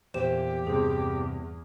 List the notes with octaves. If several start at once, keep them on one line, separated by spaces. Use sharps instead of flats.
E2 A#2 G4 C5 E7
E2 G2 C3 G#4